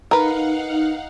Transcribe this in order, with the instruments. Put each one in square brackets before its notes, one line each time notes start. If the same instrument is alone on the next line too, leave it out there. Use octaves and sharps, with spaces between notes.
[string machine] D#4 F5 F#5 [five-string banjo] A#4 B4